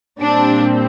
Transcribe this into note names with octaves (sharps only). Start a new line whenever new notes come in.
A#2 G3 C4 D4